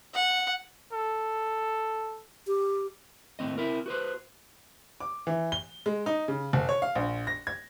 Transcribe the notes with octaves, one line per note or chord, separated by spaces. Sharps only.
F#5
A4
G4
D#2 A2 F3 C4 D#5
C4 E4 A#4
F#4 B4 C5
D6
E3
G7
G#3
D#4
C#3
F#1
C#5
F5
A#1
A#6
G#6